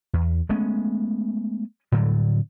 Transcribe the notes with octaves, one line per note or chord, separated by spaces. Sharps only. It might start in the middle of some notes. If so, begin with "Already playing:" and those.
E2
G#3 A3 B3 C#4
A2 D3 F#3 G3